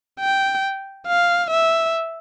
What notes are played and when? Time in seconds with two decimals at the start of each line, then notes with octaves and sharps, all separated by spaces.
0.20 G5
1.08 F5
1.51 E5